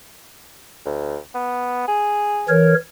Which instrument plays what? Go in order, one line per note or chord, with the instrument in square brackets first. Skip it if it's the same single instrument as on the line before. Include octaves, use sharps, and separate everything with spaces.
[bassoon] D2
B3
G#4
[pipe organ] E3 A#4 C#5